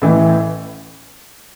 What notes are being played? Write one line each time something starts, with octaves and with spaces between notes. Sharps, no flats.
A1 A2 E3